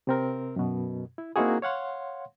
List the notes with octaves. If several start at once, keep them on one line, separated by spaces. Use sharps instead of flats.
C3 C4 A#4
F#2 B2
E4
A#3 C4 D#4 E4 F#4 G#4
C#5 F5 F#5 C6